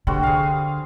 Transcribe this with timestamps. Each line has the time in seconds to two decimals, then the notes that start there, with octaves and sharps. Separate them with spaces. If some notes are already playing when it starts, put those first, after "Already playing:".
0.07 D3 G3 C4 F#4
0.23 G#4 F5